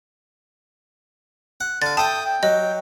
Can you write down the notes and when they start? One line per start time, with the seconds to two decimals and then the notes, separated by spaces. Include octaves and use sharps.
1.61 F#5
1.82 D3 F5 A6
1.97 A4 E5 G5 A5 D#6 G6
2.25 G5
2.43 F#3 D#5